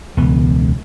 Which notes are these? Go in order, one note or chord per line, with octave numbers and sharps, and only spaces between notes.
E1 C#2 E3 B3